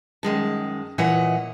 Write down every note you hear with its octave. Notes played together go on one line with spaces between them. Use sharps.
F#2 D#3 G#3 A5
A#2 E3 C#5 D#5 F#5